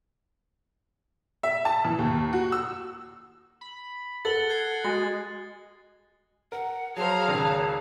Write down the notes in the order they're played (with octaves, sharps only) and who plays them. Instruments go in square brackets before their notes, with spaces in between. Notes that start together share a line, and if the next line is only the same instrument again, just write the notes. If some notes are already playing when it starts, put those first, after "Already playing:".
[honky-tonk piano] E5
A5
E3
D#2
F#4
E6
[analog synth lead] B5
[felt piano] A4 [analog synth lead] F#5 [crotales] A6 F#7 G7
[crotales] F#6 G#6 C7
[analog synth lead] G#3 [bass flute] F#4 [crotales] A6
[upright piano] A#4 [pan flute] F#5
[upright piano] F#3 C5 [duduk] G#4 [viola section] F5 A#5 [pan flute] A5
[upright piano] G#1 C#2